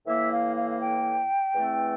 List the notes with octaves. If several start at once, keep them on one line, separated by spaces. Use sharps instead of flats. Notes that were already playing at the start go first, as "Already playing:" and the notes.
A2 E3 A#3 E5
F5
F5
F5
G5
E2 E3 A3 C4